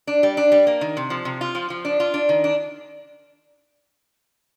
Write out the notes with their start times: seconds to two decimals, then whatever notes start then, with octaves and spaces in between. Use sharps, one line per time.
0.07 D4
0.23 G3
0.37 D4
0.52 G3
0.67 A#3
0.81 D#3
0.97 C3
1.10 F3
1.25 C3
1.41 F4
1.55 F3
1.70 F3
1.85 D4
2.00 F4
2.14 D4
2.29 D#3
2.44 D4